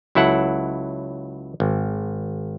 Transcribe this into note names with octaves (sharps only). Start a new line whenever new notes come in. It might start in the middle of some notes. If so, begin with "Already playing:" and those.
C#2 F#3 E4 A4 F#5
G#1